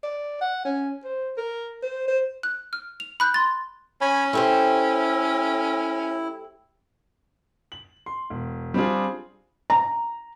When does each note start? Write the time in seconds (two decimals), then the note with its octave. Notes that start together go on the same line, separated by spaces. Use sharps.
0.03 D5
0.41 F#5
0.65 C#4
1.04 C5
1.37 A#4
1.83 C5
2.08 C5
2.43 F#6
2.73 F6
3.00 F7
3.20 B5 F#6 G6
3.34 C6 A6
4.01 C#4 C#5 G#5 B5
4.33 A3 E4 G4 C5
7.72 F#7
8.06 C6
8.30 E1
8.74 G3 C4 D4 F4 G#4
9.70 A#5